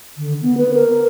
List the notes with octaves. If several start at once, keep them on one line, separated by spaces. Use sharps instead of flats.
D3
B3
B4
A#4